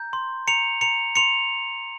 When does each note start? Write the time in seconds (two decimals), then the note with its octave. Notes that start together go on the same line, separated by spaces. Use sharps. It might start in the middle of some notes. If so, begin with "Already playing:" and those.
Already playing: A#5 G6
0.13 C6
0.48 A#5 C#7 F7
0.81 A#5 C#7 F7
1.16 C6 C#7 F7